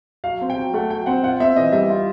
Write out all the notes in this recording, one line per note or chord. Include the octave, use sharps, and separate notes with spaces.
F#3 F5
C4
G5
F#3
A3 F#5
F#3 G5
C4 F#5
F4 F#5
C4 E5
E3 D#5
G3 E5
F4